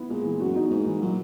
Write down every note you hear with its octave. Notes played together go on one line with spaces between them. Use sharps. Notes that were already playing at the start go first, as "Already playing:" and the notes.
Already playing: B3 E4
A#2 G#3
E3
F#2 F#4
E2 D#4
G#2 A#3
E3
A#2 F#3